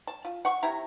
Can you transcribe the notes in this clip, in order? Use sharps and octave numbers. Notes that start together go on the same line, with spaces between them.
A5
F4
F#5 C#6
C3 E4 A#5